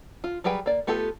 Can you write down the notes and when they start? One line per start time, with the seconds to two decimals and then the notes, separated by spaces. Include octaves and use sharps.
0.24 F4
0.44 F#3 G3 G#4 B4 G5
0.66 A#3 D5
0.87 A3 B3 F4 G4 A4